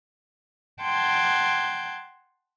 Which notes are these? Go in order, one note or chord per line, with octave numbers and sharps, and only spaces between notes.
F#5 G5 A5 C6 G6 G#6